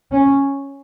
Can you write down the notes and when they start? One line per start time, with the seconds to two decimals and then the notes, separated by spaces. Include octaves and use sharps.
0.12 C#4